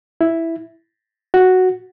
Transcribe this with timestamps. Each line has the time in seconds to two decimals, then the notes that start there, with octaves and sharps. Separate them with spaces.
0.21 E4
1.34 F#4